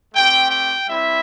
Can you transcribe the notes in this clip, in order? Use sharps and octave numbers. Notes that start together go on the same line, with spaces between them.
A3 C4 G4 G5
G5
G3 C4 E4 E5